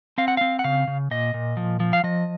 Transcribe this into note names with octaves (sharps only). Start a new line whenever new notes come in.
C4 F5
F#5
C4 F5
F#5
C#3 F5
C#3
A#2 D#5
A#2
F3
F3
F5
F3 D#5